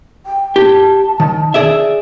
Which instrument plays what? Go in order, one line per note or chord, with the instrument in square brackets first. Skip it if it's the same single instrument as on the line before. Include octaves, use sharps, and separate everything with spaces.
[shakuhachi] G5
[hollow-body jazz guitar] G4 [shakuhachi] A5
[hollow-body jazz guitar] D#3
G#4 D5 E5